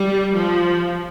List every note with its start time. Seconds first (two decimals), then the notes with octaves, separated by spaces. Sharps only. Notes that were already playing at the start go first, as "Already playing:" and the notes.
Already playing: G3
0.37 F3